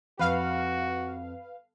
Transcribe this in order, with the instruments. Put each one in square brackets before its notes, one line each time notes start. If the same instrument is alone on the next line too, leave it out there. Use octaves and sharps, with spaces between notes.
[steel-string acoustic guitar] F2 [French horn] F#4 [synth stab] B4 F5